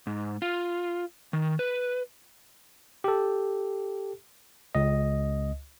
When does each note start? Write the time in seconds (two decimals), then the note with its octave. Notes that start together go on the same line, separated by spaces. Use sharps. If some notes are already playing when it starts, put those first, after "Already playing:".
0.07 G#2
0.42 F4
1.33 D#3
1.59 B4
3.04 G4 A4
4.75 C#2 D#5